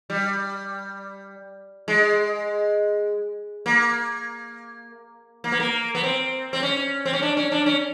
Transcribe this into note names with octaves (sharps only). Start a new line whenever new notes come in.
G3
G#3
A#3
A#3
B3
A#3
B3
C4
C4
C#4
C4
C#4
D4
C#4
D4
C#4